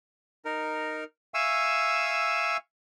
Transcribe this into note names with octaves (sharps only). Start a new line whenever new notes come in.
D#4 A#4
E5 F5 G#5 C#6 E6